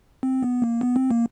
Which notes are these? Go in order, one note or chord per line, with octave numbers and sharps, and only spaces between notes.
C4
B3
A#3
B3
C4
A#3